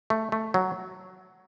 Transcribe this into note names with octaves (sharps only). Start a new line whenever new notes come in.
A3
A3
F#3